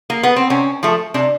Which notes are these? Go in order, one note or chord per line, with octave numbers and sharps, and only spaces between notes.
A#3
B3
C4
C3 C#4
F3 A3
C3 D4